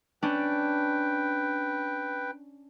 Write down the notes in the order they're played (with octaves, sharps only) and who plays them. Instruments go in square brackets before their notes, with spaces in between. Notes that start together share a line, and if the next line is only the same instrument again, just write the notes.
[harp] C#4 D4 [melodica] B4 G5